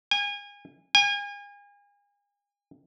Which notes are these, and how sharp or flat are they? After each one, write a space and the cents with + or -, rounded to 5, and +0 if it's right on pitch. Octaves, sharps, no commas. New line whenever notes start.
G#5 -30
G#5 -35